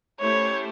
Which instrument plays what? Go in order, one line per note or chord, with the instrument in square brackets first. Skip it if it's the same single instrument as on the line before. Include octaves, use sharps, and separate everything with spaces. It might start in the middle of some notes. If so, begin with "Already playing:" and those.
[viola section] A3 C#4 E4 G4 C5 [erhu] C#5